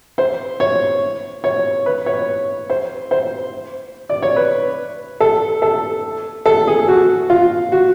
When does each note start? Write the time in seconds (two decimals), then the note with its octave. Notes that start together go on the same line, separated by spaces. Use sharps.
0.18 C5
0.60 C#5
1.44 C#5
1.86 B4
2.06 C#5
2.70 C5
3.11 C5
4.09 D5
4.22 C#5
4.36 B4
5.20 A4
5.62 A4
6.46 A4
6.67 G#4
6.88 F#4
7.30 F4
7.72 F#4